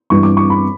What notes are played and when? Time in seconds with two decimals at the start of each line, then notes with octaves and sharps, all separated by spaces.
0.10 G2 E3 G3 C#6
0.23 D6
0.37 C#6
0.50 B5